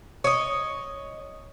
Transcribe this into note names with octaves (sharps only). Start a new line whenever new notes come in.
C#5 D#5